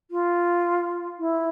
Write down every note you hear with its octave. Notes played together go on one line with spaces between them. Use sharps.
F4
E4